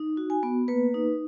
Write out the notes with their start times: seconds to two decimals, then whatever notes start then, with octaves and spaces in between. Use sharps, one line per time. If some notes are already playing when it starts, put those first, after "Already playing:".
Already playing: D#4
0.17 F#4
0.30 G#5
0.43 B3
0.68 A#3 B4
0.94 D#4